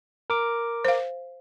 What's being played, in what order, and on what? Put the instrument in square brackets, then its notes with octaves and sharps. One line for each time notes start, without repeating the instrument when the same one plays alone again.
[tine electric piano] A#4 D6
[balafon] C5 F5